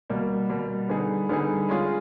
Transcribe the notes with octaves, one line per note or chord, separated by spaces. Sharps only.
B2 G3 A#3
B2 G3 A#3
D3 G3 B3 D#4 G#4
D3 G3 B3 D#4 G#4
G#3 C#4 F4 G#4